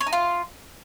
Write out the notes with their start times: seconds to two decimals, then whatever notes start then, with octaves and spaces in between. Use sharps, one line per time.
0.01 C#5
0.07 D#4
0.13 F4